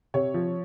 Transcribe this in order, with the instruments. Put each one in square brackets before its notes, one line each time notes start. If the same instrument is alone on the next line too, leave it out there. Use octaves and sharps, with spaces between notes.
[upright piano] C3 C#5
F3